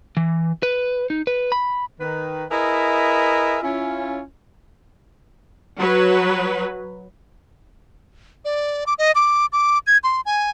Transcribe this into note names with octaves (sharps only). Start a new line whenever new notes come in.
E3
B4
D#4
B4
B5
D#3 B4
E4 G#4 A#4 B4 D#5 E5
C#4 E4 F4
F#3 B4
D5
D6
D#5
D6
D6
G#6
C6
G#5